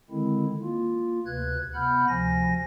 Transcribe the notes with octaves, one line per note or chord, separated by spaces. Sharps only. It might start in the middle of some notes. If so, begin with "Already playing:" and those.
D3 D#3 G#3 C4 E4
A#3 F4
D2 C3 B4 F#6 G#6
C3 B3 F#5 B5 F6 G6
D2 C3 F3 G#5 A#6